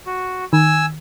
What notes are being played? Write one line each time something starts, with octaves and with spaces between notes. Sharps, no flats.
F#4
D#3 G#5 E6